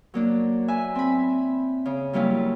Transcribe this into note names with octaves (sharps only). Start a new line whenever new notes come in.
F#3 A#3 D4
B4 E5 G#5
C4 B5
C#3
F#3 G3 A#3 C#4 E4 F4